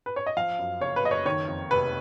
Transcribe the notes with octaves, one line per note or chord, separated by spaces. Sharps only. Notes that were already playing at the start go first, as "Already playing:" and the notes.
B4
C#5
D#5
F3 F5
F#2
F#1 C#5
B4
F#1 D#5
C#5
D#3 C#5
F2
F1 B4